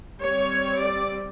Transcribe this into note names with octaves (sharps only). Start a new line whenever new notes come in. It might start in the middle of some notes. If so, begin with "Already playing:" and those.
G3 C4 C#5
D5